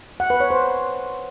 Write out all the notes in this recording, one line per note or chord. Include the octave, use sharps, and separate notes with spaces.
F#5
B4
C#5
C5